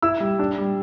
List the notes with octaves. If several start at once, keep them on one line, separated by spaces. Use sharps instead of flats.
E4 E6
G3
D4
G3